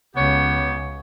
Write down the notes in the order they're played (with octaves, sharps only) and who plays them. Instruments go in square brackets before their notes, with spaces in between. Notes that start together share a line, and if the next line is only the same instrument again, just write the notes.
[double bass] C#2 C#3 [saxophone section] B3 G4 C#5